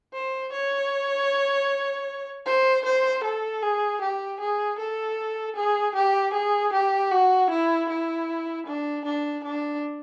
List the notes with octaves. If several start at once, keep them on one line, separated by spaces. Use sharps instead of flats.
C5
C#5
C5
C5
A4
G#4
G4
G#4
A4
G#4
G4
G#4
G4
F#4
E4
E4
D4
D4
D4